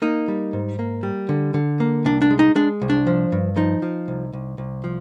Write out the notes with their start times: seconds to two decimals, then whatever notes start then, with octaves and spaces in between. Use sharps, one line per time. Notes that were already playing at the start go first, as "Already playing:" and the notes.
0.02 A#3 D#4
0.28 G3
0.53 G#2
0.79 A#3
1.03 G3
1.29 D3
1.54 D3
1.80 A#3
2.05 C2 D4
2.22 D4
2.31 G#3
2.39 D#4
2.56 G#3 D4
2.82 C2
2.90 D4
3.07 F3
3.32 G2
3.57 F3 D#4
3.82 F3
4.08 C2
4.33 C2
4.58 C2
4.84 F3